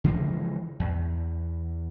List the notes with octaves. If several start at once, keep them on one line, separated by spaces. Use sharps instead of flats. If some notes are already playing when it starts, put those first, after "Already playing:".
C#3 E3 F3 G#3
E2